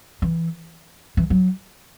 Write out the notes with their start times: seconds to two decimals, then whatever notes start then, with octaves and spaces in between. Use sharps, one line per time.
0.22 E3
1.17 E3
1.30 F#3